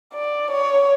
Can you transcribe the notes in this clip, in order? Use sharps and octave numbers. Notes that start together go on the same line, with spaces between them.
D5
C#5